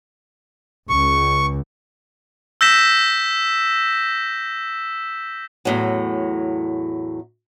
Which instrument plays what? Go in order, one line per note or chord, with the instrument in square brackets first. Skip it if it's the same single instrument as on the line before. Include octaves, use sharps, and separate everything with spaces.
[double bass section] C#2 [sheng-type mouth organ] C#6
[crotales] E6 G6 A#6 B6 E7
[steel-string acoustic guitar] E2 A2 F#3